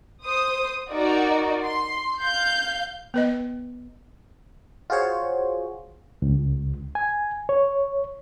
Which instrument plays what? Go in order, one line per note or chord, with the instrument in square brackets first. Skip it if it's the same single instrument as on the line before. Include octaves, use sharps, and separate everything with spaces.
[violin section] C5 D#6
D#4 F#4 A#4 D5
C6
F5 G6
[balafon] B3 B4 D#5
[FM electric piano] F4 F#4 G#4 C5 C#5
[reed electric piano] C#2
G#5
C#5